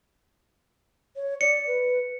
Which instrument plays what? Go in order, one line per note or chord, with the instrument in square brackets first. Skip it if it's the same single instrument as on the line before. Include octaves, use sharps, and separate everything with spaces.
[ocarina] C#5
[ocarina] D5 [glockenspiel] C#7
[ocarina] B4